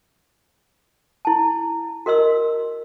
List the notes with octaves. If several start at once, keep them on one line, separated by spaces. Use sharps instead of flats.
E4 A5
F#4 A#4 D#5 C6 E6